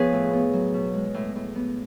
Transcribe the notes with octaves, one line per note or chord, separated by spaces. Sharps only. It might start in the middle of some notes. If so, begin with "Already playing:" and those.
Already playing: F3 B3 G#4 B4 C#5 F5
A2
B3
F#3
B2
G#3
A2
A2
B3